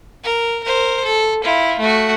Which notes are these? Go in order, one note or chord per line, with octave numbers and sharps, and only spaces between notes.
A#4
A#4 C5
A4
E4 F4
A3 F#4